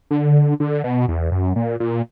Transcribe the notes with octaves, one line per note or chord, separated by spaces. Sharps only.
D3
D3
B2
E2
F#2
A#2
A#2